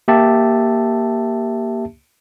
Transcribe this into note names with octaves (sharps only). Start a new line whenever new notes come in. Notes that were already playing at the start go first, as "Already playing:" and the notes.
A#3 G4 E5 A5